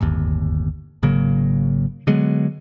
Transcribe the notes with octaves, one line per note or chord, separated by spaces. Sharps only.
D1 G1 D#2
G#1 C#3 F#3 A#3
D3 F#3 G#3 B3